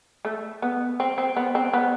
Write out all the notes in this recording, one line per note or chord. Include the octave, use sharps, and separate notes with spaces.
A3
B3
C4
C4
B3
C4
B3